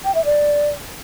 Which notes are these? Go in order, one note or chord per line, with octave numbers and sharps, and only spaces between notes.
G5
E5
D5